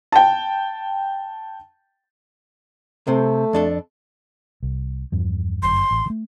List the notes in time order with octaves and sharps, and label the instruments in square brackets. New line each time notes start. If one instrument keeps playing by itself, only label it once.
[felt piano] G5 A5
[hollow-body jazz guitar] C3 C4 [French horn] A3
[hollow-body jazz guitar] F2 D4 A4
[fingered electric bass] C2
E2 G2 F3
[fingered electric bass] G1 F#2 [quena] C6
[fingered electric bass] A1
D#3 A3